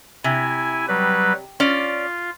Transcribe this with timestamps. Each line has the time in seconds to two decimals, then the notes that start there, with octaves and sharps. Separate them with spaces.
0.24 C3 E4 G#5
0.88 F#3 G3 B4
1.60 C#4 F4 D5